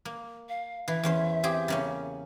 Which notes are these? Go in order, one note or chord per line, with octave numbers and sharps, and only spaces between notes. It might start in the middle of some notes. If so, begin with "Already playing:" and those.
A#3
F5
E3 E5
E2 C#4 C5
C4 G4 G#4
C#3 A#3 C#4